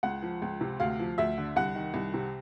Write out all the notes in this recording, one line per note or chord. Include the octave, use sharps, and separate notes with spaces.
C#2 F#5
F3
C#2
C3
D2 F5
F3
D2 E5
D3
C2 F#5
D#3
C2
C3